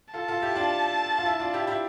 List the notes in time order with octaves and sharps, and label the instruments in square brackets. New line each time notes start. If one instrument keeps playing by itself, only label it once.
[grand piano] F4 A4 [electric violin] A5
[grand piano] F4 A4
E4 G4
D4 F4
F4
E4
D4 F4
E4 G4
E4 G4